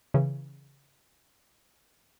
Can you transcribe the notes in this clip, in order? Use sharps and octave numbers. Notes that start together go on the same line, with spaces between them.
C#3 E3